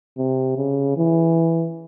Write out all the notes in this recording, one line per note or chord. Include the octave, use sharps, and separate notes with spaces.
C3
C#3
E3